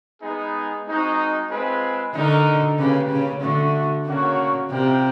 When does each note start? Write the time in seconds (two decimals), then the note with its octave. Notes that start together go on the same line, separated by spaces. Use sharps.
0.22 G#3 B3 D#4 G#4
0.86 G#3 C4 D#4 F#4
1.50 G#3 C4 F4 G#4 B4
2.14 D3 D#4 F#4 A#4
2.78 C#3 A#3 D4 G4 B4
3.10 C#3
3.42 D3 A3 D4 F#4
4.06 C#3 A#3 D4 F#4 A#4 C#5
4.70 C3 F4 A#4 D5 G5